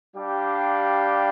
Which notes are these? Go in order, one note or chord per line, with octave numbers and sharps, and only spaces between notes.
G3 D4 G4 D5 F5